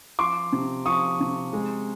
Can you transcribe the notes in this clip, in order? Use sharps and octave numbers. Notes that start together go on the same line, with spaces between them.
F3 C6 D6
C3
F3 C#6 D#6
C3
G#3